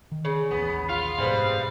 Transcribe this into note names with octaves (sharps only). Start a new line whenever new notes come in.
D#3
C#3
A1 D#2 B3
F4 F5
F#1 G#2 B2 G3 C4 G#4 B4